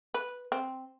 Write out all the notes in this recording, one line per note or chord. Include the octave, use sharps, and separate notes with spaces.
B4
C4